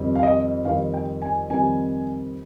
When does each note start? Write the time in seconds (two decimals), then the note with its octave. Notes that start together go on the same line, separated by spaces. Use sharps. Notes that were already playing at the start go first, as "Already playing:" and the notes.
Already playing: F2 D#3 G3
0.15 F5
0.23 D#5
0.65 F2 D#3 G3 F5
0.94 G5
1.22 G#5
1.50 F2 D#3 G3 G#5